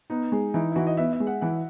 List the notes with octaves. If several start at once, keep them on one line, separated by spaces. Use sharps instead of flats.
B3 D#4
G#3
E3 D#4
E4
E3 F#4
D#5
B3 E5
E5
G#3
F#5
E3 F#5